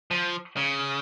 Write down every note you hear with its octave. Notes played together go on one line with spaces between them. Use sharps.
F3
C#3